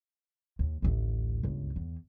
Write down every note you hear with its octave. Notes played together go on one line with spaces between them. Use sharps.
D#2
A1 D2
G1 C#2
E2